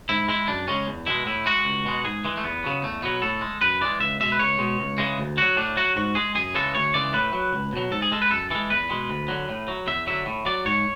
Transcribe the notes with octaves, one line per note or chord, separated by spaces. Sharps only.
G#2 E4
G#3 E4
F#2 D4
C#3 G#3 C#4
E2
B2 G#3 E4
A2 E4
G#3 F#4
C#2
B2 G#3
G#2 G#4
E3 G#3
A3
E2 B3
C#3 F#3
E2 A3
B2 F#3 B3
A2 A4
G#3
F#2 B4
E3 G#3 D5
C#2 E5
B2 G#3 E5
B4
C#2 C#5
B2 G#3
C#2
C#3 E3 G#3
D2
D3 F#3 F#4
A2 D4
F#3 F#4
G#2 F#4
G#3 G#4
F#2 G#4
C#3 E3 G#3 A4
D2 C#5
C#3 E3 G#3 D5
A2 B4
F#3
C#2
B2 F#3
G#2 A4
G#4
G#3 A4
B4
F#2 A4
E3 G#3 A4
E2 B4
B2 G#3
D2
D3 F#3
A2
F#3
E2 E5
D3 F#3 E5
A2
F#3 D5
G#2 C#5